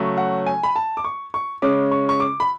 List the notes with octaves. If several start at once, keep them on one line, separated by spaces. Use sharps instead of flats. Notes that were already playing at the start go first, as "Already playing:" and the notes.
Already playing: C#3 F#3 A3 C#4
F#5
G#5
B5
A5
D6
C#6
C#6
C#3 G#3 C#4 D6
C#6
C#6
D6
B5